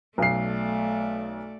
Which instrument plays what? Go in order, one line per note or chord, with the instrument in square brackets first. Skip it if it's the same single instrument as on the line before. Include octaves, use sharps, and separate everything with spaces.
[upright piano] B1 C7 [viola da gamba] A3 D5